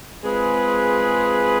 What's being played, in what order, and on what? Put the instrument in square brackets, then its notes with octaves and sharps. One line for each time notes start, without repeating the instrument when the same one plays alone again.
[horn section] G#3 C4 F4 G#4 B4